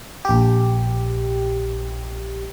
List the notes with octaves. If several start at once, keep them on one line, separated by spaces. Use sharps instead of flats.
A#1 G4